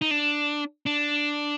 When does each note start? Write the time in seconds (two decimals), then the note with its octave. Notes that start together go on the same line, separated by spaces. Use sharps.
0.02 D#4
0.11 D4
0.86 D4